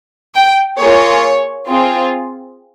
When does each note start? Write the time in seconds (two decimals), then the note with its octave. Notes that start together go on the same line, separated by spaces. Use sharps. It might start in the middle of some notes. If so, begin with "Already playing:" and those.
0.36 G5
0.79 A#3 F4 G#4 C#5
1.68 C4 F4 G#4